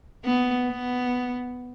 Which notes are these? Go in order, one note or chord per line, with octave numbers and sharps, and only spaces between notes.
B3
B3